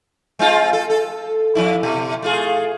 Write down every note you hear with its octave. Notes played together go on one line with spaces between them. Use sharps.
G#3 C4 F4
A4
A4
F2 G#2 E4
B2
A3 F4 G#4